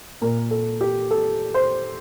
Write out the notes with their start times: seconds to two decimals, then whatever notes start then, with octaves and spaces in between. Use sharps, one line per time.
0.22 A#2 A#4
0.51 A4
0.81 G4
1.11 A4
1.54 C5